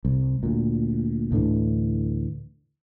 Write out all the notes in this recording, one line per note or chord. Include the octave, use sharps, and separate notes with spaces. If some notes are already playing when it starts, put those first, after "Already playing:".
C2
D2 A#2
D2 A2 D3 E3